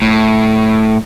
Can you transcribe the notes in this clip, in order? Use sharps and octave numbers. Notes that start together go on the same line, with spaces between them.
A2